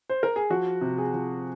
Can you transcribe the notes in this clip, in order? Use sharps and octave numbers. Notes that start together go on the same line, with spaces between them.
C5
A#4
G#4
F3 F#4
C3
G#4
F3